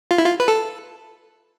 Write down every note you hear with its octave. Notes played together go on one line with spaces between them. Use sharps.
F4
E4
F4
B4
A4